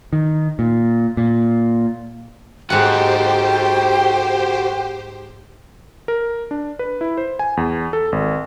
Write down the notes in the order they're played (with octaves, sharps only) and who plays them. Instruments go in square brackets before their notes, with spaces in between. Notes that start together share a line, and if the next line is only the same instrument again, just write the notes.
[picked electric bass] D#3
A#2
A#2
[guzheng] G#2 F#5 [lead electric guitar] F#4 A4 [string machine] G4 C5 [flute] G5
[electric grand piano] A#4
D4
B4
E4
C5
G#5
E2
A4
G#1